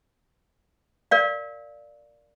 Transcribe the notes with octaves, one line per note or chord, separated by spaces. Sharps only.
A#4 D5 F5